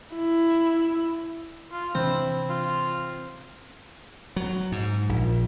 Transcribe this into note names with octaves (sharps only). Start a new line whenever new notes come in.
E4
F4
C3 E3 C4 D4 E4
F4
F#3
G#2
A#1